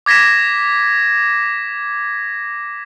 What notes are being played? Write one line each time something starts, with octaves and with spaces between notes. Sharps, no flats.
D6 G#6 A#6 B6 E7